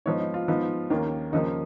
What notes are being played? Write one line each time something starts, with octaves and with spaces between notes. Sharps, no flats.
G#2 F3 B3 D#4 C#5
D#4
F4
G#2 F3 B3 D#4
D#2 D#3 A#3 C#4
D#2 C#3 F3 A#3 D#4